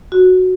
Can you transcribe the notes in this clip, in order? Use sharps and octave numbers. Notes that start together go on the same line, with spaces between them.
F#4